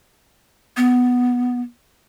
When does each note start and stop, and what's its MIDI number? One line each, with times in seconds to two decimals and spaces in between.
0.77 1.60 59